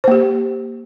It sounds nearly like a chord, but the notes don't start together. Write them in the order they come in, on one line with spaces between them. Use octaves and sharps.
C5 A#3 G4